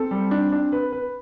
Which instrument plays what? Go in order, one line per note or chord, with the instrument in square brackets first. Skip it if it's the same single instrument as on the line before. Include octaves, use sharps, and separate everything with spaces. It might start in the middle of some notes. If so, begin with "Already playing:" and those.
Already playing: [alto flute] C4 [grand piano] A4
[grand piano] G3
D4
D4
B4
B4